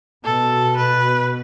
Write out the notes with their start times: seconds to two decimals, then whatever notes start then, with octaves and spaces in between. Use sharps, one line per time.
0.24 B2 A4
0.77 B4